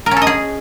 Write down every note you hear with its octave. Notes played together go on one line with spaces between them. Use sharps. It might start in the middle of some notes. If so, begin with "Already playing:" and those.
A#4
C#4
A4
D#5
G#4